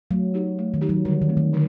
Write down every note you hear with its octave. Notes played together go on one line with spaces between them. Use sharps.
F#3 A3
D#4 G4
A3
D#3
D#4 G4
F#3
D3 G3
D#3
A3 C4
D#3
D3